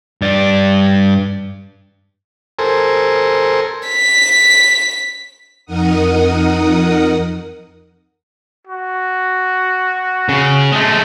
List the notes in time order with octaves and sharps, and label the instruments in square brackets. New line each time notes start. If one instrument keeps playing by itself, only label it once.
[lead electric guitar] G2 D5
[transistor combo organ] A4 A#4 C5 G#5
[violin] B6
[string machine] F2 D#4 A#4 F#5 D#6
[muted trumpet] F#4
[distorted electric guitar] C#3
G#3 A3